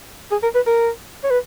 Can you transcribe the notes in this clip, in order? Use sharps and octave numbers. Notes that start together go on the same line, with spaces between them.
G#4
A#4
B4
A#4
C#5
B4